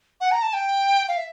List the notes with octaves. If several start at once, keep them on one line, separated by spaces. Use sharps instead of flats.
F#5
A#5
A5
G5
F5
E5